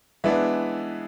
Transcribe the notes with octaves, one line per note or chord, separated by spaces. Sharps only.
E3 G#3 B3 D4 E5